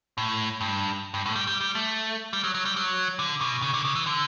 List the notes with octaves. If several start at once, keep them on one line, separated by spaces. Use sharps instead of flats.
A2
G2
G2
A2
G3
G3
G3
A3
G3
F#3
F#3
G3
F#3
D3
B2
C#3
D3
C#3
E3
D3